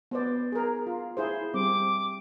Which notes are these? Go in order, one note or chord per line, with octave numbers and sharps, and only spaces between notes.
B3 C5 D5
G#4 A#4
F4
E4 G#4 C5
G3 C4 D6